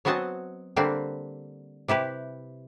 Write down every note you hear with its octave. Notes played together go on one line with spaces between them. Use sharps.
F#3 B3 C4 F#4 D#5 A5
D3 G3 A#3 C4 B4
C3 E4 G4 B4